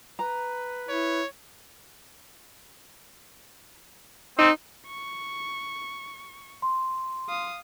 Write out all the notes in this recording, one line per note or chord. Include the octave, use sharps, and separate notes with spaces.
B4 A#5
E4 C#5
C4 D#4
C#6
C6
F5 D#6